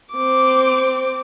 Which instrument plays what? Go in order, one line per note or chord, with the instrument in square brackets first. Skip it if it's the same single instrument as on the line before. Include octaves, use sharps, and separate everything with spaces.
[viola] C4 D6